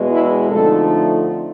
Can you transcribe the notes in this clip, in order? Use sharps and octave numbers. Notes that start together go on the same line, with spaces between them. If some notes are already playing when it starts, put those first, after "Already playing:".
Already playing: E2 B2 G#3
E4
D3 F3 A3 C4 D#4 A4